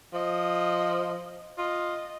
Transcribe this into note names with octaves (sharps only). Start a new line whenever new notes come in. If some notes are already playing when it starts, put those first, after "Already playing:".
F3 D#5
F4 D#5